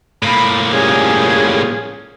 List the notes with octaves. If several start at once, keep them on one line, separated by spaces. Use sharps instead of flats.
A2 A#3 B5
F3 G3 C#4 G#4